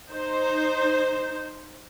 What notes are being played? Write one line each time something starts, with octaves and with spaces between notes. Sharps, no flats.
D#4 C5